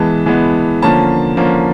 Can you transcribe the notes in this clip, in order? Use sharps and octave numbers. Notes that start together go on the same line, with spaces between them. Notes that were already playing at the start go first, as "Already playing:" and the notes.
Already playing: E3 G#3 B3 A5
E3 G#3 B3
D3 F3 A#3 C#4 A5
D3 F3 A#3 C#4